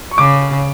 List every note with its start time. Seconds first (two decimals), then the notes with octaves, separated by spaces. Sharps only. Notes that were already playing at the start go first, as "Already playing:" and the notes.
0.11 C#6
0.18 C#3 D6